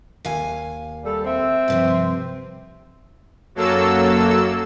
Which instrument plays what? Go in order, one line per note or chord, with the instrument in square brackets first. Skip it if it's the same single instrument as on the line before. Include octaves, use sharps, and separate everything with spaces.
[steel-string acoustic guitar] D#2 F5 G#5
[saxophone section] G3 A4
C4 E5
[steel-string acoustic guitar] G2 C3 F3
[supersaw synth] F#2 F#3 A#3 A4 E6